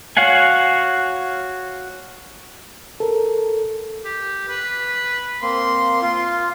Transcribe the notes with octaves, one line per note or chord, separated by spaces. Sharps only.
F#4 C#5 F5 F#5 G#5
A4 A#4
G4
B4
A#3 C4 C6
F4